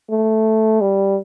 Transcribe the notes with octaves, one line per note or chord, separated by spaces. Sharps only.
A3
G3